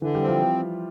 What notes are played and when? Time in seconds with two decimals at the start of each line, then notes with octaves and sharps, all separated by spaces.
0.02 D3 E3 E4
0.15 G3 G4
0.22 C4
0.28 F3 F4